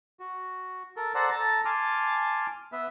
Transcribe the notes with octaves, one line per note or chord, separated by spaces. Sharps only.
F#4
A4 A#4
A4 C5 D5 F#5 A#5
A4 A5 A#5
G#5 A5 C6 D6 F6
B3 B4 E5